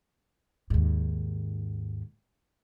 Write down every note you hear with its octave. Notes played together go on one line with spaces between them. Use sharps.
D#2 G#2